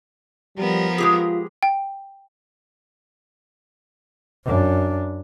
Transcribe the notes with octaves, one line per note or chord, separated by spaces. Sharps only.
F3 G3 B3 A#4
G#3 F4 G4 G#4
G5
F#2 D4